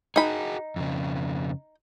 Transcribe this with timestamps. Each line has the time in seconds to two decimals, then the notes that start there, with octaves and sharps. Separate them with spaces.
0.16 D#4 F#4 G#4 B5
0.76 F2 C#3